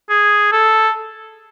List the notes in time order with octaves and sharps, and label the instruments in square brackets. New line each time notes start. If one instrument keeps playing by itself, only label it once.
[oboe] G#4
A4